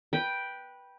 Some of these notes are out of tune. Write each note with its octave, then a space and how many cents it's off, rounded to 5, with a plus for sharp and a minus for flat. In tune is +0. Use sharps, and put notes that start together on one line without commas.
B4 -15 G5 +0